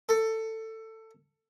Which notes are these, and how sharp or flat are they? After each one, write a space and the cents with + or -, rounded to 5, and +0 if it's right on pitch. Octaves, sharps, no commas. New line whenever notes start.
A4 +15